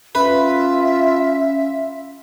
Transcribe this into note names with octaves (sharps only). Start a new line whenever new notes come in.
C#4 F4 B4 E5